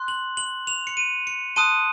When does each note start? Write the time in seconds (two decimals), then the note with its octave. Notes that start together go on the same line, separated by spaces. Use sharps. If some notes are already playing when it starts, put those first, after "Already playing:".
Already playing: C6 F#6
0.08 F#7
0.37 F#7
0.67 F7
0.87 C#7
0.97 D#7
1.27 C#7
1.56 A5 C6 D#6 F#6 D#7